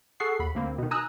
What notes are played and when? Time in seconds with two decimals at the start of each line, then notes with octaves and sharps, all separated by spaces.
0.20 G#4 A4 F#5 C#6 C7
0.39 D#2 B5
0.55 D2 A#3 C4
0.78 B2 D#3
0.91 G#5 A#5 D#6 E6 F#6